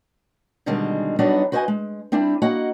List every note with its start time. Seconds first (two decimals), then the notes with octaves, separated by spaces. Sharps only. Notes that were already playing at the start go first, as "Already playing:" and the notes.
0.66 B2 D3 D#3 G3 G#3 C4
1.19 F#3 G3 B3 D4 D#4 F#4
1.52 F#4 B4 C5 D#5 F5 G#5
1.68 G#3
2.12 G3 C4 D4 E4
2.42 A#3 F#4 D#5 F#5